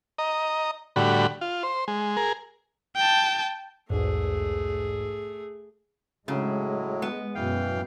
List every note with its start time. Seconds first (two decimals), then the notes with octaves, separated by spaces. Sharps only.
0.18 D#5 A#5
0.96 A2 D3 G3 F#4 B5
1.41 F4
1.63 C5
1.88 G#3
2.17 G#4 A#4
2.96 G5 A5
3.90 B1 E2 G#2 A3 G#4
6.28 A2 C#3 F#3 G#3
7.02 B3
7.35 F#2 B2 E3 F5 G5